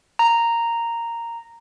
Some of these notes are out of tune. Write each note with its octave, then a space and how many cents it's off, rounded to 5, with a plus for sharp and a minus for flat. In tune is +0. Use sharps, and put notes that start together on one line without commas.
A#5 -5